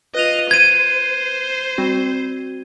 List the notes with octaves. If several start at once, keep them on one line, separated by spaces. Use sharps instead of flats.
F4 B4 D#5 F#6 F7
C5 G#6 D#7
G3 C4 F#4